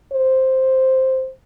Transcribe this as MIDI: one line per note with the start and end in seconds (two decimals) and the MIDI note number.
0.13 1.30 72